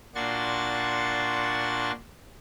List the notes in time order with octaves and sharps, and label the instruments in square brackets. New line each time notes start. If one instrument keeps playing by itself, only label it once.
[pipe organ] A#2 D4 F#4 C6 C#6 A6